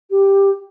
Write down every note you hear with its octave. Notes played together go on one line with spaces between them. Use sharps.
G4